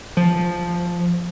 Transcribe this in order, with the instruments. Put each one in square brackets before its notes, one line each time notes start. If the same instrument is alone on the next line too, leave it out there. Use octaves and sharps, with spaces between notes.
[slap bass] F3